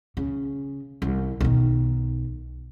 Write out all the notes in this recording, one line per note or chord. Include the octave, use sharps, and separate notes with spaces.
C#3
C2
B1 D#3